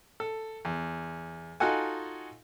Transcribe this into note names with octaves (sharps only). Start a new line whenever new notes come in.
A4
E2
D#4 F4 F#4 A4 F#5 G#5